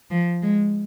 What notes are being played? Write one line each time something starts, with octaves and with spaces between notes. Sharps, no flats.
F3
G#3